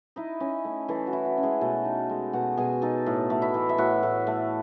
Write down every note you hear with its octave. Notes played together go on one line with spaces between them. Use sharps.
D#4 E4 D#5
C#4
A3
E3 A3 A4
F#4
E4
F#4
C#4
G#3 G#4
B2 A3 A4
D#4
G#3
B2 F#4 F#5
B2 G#4 G#5
D#4 A4 A5
A2
A3
E4 E5
E3
E5
A2 F#4 F#5
A2
A3